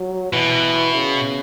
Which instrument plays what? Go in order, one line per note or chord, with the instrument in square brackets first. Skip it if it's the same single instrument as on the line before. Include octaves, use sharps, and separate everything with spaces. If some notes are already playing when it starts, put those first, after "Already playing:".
Already playing: [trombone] F#3
[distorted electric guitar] B2 [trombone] E3
[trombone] C#3